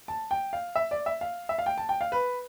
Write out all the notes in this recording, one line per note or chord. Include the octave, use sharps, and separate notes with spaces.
A5
G5
F5
E5
D5
E5
F5
E5
F5
G5
A5
G5
F5
B4